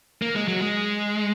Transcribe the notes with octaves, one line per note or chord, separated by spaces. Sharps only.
A#3
G#3
F#3
G#3